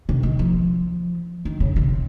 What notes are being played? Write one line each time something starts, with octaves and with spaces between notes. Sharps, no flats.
C3
D#3
F3
D#3
C#3
C3